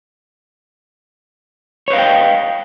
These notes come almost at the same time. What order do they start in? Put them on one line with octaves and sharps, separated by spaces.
C#5 B4 F5 D#5 G5